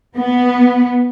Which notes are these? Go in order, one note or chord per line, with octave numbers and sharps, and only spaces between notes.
B3